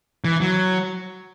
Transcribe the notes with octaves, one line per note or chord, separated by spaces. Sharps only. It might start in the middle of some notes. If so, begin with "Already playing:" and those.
E3
F#3